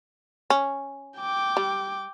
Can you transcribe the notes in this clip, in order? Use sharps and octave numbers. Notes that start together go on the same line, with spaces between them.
C#4
G5 D6
G3